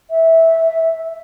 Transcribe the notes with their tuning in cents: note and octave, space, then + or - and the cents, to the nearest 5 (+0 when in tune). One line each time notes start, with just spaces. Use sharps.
E5 -10